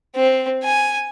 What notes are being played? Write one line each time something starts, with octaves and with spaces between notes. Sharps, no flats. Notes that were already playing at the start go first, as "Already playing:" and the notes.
C4
G#5